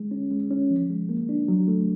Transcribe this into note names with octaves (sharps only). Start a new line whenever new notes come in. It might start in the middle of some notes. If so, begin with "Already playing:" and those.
Already playing: G#3
C#4
G#3
C#4
F3
G#3
A#3
D4
F#3
A3